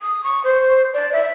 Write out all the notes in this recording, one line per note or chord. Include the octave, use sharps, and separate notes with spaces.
D#6
C#6
C5
D5
E5